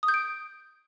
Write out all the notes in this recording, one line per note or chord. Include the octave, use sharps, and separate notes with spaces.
D#6
G6
D7